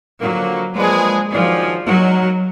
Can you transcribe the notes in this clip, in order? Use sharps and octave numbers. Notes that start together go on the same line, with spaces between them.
D3 F3 F#3 A#3
F3 G#3 A#3 D4 G#4 B4
D#3 F3 F#3 D4 G#4
F#3 G#3 D#4 F#4 A#4